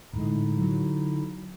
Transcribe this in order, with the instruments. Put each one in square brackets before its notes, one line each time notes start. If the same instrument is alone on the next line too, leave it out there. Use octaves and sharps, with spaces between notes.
[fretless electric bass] A2 G#3 [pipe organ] D3 D#4 E4
[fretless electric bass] F#3